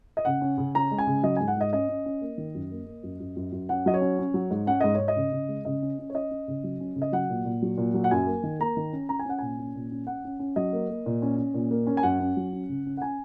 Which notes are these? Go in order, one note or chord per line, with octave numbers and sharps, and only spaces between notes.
D#5
C#3 F#5
C#4
C#3
C#4 A#5
G#3
G#5
C#3
F#3 D#5
G#2 G#5
F#5
G#2 D#5
C#4 D#5
C#4
C#4
A#3
D#3
F#2
A#3
A#3
F#2
F#2
F#2
F#2
C#4 F#5
F#3 D#5
C#5
C#4
C#4
F#3
G#2
C#4 F#5
G#2 D#5
G#2 C#5
D#5
C#3
C#3
G#3
C#3 D#5
C#4
C#4
C#5
C#4 D#5
C#4
C#3
F#3
C#4
C#3
D#5
F#3 F#5
A#2
A#2
F#3
A#2
F#3
F#5
F#2 G#5
A#3
D#3
A#3 A#5
D#3
C#4
C#4 A#5
G#5
C#4 F#5
A#2 G#5
C#4
A#2
C#4
C#4 F#5
C#4
C#4
F#3 D#5
A#3
A#3
A#2
C#4
C#4
A#2
A#3
C#4
G#5
F#2 F#5
C#4
F#3
C#4
C#3
C#4
F#5
C#4 G#5